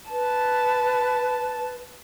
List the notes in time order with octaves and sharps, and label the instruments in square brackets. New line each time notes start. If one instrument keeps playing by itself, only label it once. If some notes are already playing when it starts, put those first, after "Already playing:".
[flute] B4 [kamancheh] A5